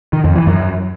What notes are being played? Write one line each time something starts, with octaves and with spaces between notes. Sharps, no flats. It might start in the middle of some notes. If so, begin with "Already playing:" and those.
D#3
F2
E3
F#2